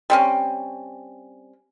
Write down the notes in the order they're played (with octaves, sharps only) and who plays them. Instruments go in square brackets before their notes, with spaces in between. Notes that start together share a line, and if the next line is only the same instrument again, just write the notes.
[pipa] G3 C4 C#4